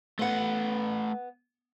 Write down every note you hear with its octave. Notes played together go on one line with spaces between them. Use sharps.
A3 B3 B4 F#5